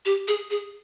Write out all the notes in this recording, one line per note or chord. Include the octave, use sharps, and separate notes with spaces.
G4
G#4
G#4